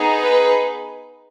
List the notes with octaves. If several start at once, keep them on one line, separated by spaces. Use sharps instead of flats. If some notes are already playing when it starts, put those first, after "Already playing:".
Already playing: B3 D#4 G#4
B4